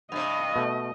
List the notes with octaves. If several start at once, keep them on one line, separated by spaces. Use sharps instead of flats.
G2 C3 D#5
B2 A3